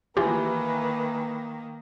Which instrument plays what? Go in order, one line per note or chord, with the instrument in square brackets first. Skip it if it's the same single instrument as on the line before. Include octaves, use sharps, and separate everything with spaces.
[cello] D#3 A#3 [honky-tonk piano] E3 [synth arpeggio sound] F4 G4 [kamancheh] B4